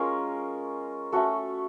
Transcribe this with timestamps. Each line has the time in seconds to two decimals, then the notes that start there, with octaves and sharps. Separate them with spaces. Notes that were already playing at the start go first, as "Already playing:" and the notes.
Already playing: G#3 C#4 F4 A#4
1.12 A3 C#4 F#4 A4